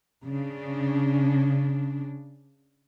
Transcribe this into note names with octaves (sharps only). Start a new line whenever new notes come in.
C#3 D4